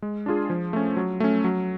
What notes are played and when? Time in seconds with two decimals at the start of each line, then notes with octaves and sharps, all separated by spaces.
0.02 G#3
0.26 D4 F4 G#4
0.50 F3
0.73 A3 C#4
0.97 F#3
1.20 A3 C#4
1.44 F#3